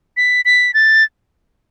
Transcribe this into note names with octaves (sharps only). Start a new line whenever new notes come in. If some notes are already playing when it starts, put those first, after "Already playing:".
B6
B6
A6